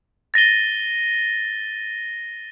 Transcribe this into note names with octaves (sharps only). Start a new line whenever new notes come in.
A6 A#6 D#7 G7